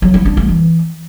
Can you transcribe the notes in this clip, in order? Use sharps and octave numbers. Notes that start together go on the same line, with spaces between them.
F#3
E4
D4
A3
E3